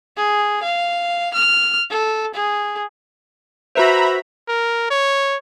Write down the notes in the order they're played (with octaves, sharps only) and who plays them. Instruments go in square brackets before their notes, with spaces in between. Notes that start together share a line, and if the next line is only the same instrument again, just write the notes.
[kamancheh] G#4
F5
F6
A4
G#4
[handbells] F#4 B4 C5 [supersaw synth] E5 A#5 B5
[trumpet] A#4
C#5